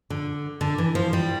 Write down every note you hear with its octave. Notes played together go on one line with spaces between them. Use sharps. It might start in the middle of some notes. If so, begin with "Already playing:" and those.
D3
D3
E3
F3
G3